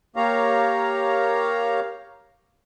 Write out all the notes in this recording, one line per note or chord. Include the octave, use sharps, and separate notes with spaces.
A#3 G4 C#5 F5 A#5